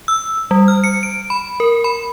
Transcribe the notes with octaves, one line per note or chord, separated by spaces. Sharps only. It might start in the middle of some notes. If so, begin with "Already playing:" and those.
E6
G3
F6
C#7
D7
B5
A#4
B5